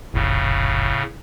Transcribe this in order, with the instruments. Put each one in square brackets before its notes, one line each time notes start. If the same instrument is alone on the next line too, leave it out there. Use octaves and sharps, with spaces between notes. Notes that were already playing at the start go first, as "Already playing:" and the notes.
[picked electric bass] F1 A#1 [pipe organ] A2 C#3